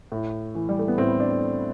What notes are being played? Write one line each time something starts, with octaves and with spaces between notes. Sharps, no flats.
A2
E3
G3
A3
B3
A2 C4
D4